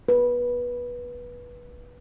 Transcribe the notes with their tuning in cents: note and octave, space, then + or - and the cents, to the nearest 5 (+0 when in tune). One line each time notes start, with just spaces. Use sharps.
B4 -20